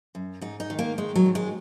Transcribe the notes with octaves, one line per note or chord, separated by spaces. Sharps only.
F#2
G#2 D#4
D#4
D#3
A#3
D#3 G#3
F#3
G#2
G#3